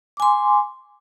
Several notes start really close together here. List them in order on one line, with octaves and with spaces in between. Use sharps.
D6 G#5 C6